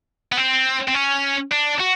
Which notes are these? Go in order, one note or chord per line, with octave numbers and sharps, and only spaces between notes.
B3
C4
C4
C#4
D4
F#4